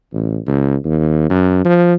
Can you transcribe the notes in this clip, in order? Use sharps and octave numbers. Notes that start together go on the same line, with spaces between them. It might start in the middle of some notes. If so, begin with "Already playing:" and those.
A1
C#2
D#2
F#2
F3